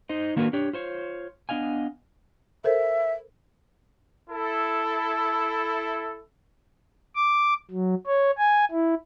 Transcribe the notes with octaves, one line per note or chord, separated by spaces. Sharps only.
D#4 C5 D#5
D#3 A#3 D4 F#4 A#4 B4
D4 G4 C#5
F4 C5 C#5
B3 D4 D#5 F5 G#5
A4 A#4 C5 E5
E4 A4
D6
F#3
C#5
G#5
E4